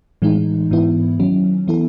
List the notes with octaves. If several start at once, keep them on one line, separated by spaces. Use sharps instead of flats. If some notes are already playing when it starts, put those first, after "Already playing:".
A2 E3 G#3 D#4
G#2 E3 B3 E4
D#3 F#3 C#4
E3 B3 E4 A4